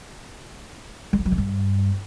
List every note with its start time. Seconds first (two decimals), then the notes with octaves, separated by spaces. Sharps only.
1.13 G3
1.19 F3
1.25 F#3
1.32 C#3
1.38 G2